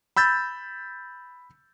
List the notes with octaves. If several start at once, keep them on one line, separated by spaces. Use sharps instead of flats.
B5 E6 G6 A6